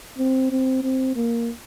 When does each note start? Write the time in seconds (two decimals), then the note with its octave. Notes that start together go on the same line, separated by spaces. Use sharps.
0.18 C4
0.51 C4
0.83 C4
1.16 A#3